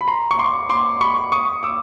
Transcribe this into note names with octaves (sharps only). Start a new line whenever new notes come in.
B5
A#5 C6
C#6
C6 D6
C6 D6
B5 C#6
C#6 D#6
D6 E6